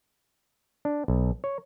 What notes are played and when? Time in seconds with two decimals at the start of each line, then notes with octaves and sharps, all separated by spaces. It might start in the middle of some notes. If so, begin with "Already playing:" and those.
0.85 D4
1.08 B1
1.44 C#5